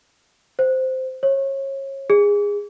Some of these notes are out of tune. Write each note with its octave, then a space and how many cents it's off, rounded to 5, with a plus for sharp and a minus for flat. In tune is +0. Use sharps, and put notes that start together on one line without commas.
C5 -10
C#5 -30
G#4 -20